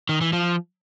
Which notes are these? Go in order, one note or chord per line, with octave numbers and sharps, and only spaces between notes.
D#3
E3
F3